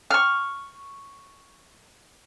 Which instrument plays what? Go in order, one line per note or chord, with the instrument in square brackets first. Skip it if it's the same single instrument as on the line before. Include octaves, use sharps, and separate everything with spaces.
[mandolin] C#6 F6